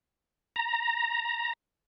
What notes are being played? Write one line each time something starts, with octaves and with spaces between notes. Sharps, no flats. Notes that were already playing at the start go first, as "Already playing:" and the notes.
A#5